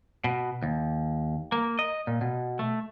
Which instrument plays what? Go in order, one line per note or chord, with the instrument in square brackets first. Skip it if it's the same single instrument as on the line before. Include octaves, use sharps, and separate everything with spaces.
[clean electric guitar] B2
D#2
A#3
D#5
A#2
B2
A3